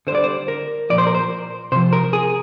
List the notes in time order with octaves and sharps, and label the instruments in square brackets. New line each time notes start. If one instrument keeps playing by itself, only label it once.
[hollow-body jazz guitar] D3 C5
G3 D5
C5
A#4
A#2 F3 D5
C5
A#4
C5
C3 F3 C5
A#4
G#4